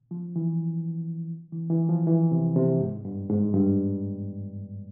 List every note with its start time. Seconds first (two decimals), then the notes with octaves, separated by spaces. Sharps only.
0.11 F3
0.36 E3
1.52 E3
1.70 E3
1.89 F3
2.07 E3
2.31 C3
2.56 C3
2.81 G#2
3.05 G2
3.29 G#2
3.54 G2